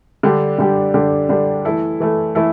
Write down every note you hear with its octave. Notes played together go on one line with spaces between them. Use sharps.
D3 G3 D4 G4
D3 G3 D4 G4
D3 G3 D4 G4
D3 G3 D4 G4
E3 A3 E4 A4
E3 A3 E4 A4
E3 A3 E4 A4